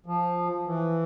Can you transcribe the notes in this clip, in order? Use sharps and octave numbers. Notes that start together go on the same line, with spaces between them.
F3
E3